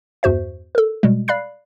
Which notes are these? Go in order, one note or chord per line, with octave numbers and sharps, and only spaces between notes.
E2 G2 F#4 C5 E5
A4 A#4
B2 G3 G#3
D5 F5 B5 F#6 C7